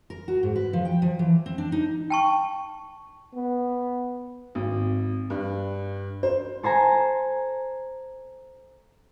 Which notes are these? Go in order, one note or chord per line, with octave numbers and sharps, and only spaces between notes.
A#4
F#4
G#2
B4
F3
G5
F3
E3
C4
D4
D#4
G5 A5 C#6
B3
G#1
G2
C5
A4 C5 G#5 A#5